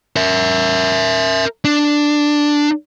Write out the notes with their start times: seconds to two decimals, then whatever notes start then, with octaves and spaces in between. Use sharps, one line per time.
0.16 A#4 E5
1.65 D4